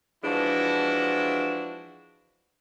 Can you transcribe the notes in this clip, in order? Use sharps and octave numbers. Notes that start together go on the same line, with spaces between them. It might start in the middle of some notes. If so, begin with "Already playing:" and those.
E3 F3 G#3 D4 E4 F#4